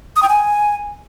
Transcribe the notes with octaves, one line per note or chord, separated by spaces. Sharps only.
D#6
G5
G#5